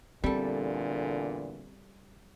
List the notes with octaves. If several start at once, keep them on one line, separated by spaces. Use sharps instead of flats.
E2 A#2 D3 G3 C4 A4